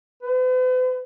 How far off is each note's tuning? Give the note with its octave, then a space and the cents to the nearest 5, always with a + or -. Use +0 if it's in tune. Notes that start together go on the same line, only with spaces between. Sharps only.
B4 +45